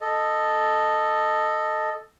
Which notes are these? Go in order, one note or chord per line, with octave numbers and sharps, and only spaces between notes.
A4 D#5